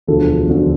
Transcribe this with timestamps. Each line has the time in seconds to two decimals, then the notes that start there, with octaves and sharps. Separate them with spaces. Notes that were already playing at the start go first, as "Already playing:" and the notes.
0.07 E1 D2 D3 F3 A4
0.47 E1 D2 D3 F3